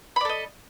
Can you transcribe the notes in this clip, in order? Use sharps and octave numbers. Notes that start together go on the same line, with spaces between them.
A4 D5 D#5 B5